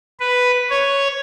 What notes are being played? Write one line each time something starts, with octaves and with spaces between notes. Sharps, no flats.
B4
C#5